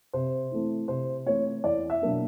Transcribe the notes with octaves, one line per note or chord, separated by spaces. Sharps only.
C3 C5
E3 A3 C4 E4
C3 C5
E3 A3 C4 E4 C#5
E2 D5
E5
B2 F#3 A#3 D4